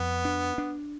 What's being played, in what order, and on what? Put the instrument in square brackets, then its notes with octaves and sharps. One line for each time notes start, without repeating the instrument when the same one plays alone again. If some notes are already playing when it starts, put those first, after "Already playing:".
Already playing: [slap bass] F2 [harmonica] B3
[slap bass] D4
D4